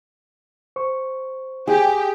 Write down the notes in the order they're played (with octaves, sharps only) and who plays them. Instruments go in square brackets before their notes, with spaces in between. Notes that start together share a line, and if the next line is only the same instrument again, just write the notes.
[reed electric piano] C5 C#6
[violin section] G4 [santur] G#4